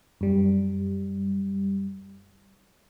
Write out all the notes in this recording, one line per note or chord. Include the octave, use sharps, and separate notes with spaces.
F#2 G3